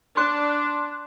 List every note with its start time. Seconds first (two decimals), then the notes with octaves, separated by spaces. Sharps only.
0.17 D4 C6 F#6